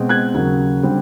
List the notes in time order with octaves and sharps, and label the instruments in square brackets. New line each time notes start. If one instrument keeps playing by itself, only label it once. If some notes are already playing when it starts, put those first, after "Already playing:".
Already playing: [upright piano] B2 G#3 C4
F#6 G#6
D#2 C#3 F#3 A#3
D3 G3 C4